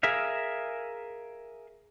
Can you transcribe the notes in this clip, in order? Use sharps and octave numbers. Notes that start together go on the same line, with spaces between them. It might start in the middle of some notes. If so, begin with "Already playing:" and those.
G#4 A#4 E5 F5